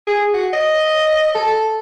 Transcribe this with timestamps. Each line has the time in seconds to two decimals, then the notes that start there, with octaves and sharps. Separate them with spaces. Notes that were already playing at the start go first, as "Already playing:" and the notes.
0.07 G#4
0.34 F#4
0.53 D#5
1.35 A4